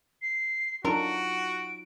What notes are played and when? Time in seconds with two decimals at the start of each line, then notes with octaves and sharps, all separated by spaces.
0.21 C7
0.85 F#3 D4 D#4 F4 F#4 A4 A#4 D7